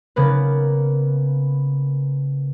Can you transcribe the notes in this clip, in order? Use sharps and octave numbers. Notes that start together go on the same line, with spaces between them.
C#3 A#3 B3 B4